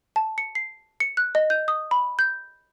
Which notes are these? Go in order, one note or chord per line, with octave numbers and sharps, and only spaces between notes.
A5
C#7
C7
C#7
F#6
D#5
G6
D#6
B5
G6